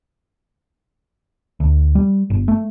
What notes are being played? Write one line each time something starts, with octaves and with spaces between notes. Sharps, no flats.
D2
G3
G1
A3